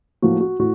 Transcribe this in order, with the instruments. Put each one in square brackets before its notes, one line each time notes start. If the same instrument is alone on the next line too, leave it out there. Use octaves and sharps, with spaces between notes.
[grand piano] A2 F3 A#3 F#4
F#4
A2 F#4